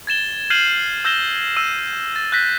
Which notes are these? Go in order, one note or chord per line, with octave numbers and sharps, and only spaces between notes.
G#6 A6 E7 G7
F6 G6 G#6 C7 D#7 F#7
E6 G6 A#6 E7 G7
E6 D#7
A6
F#6 G6 A#6 B6